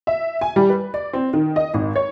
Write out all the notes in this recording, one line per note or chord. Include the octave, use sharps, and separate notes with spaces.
E5
G#5
G3
B4
D5
C4
D#3
D#5
G#1
C#5